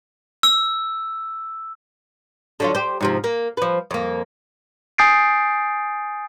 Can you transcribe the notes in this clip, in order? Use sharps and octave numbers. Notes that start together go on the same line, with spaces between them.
E6
D3 F#3 F4
G4 C5
G#2 C3 F3
A#3
F3 B4
F2 A#3
G#5 D#6 G6 A6 C7 D7